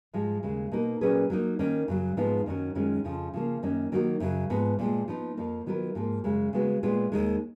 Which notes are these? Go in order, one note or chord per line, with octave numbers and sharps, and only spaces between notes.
G#2 F3 G#3
D#2 C#3 G#3
B2 A#3 D#4 A#4
A#2 F#3 C#4 G#4 B4
F#3 A#3 D#4
D#3 A#3 C#4
F#2 C#3 F#3
G#2 F3 G#3 B3 D#4
F#2 D#3 F#3 C#4
F#2 D#3 G#3 C#4 F4
F2 C#3 F3
C#3 F3 A#3
F#2 D#3 A#3 C#4
D#3 F#3 A#3 D#4 F#4
F#2 C#3 F#3
G#2 F3 B3
A#2 F3 G#3
F3 B3 D#4
F2 F3 A#3
D#3 F#3 B3 F4 A#4
G#2 F3 A#3 F4
F#2 C#3 G#3
C#3 G#3 B3 F#4
A#2 G#3 B3 F4
D#2 D#3 G#3